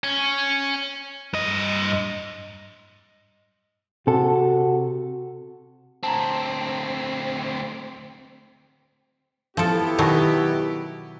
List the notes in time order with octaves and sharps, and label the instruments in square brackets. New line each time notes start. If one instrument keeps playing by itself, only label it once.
[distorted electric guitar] C#4
[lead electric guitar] G2 D#5
[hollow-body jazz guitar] C3 A4 [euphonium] F#4
[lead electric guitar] D2 C4 [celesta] A5 A#5
[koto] F3 A4 [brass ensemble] B3 E4 G4
[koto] B2 D#3 F#3